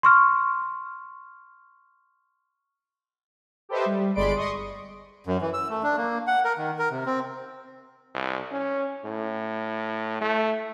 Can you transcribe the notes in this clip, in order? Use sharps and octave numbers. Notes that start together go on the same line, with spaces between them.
C6 C#6 F6
G4 A4 B4 C5 D#5 E5
G3
G1 G#3 D5 B5 C6 D7
D#5 C6 C#6 D#6
F#2
E3
E6
A3
D4
A#3
F#5
A#4
D#3
A#4
C3
C4
C2
C#4
A2
A3